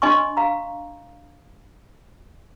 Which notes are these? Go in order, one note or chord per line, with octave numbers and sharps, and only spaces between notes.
D4 D#5 G#5 C6 C#6
F5 A#5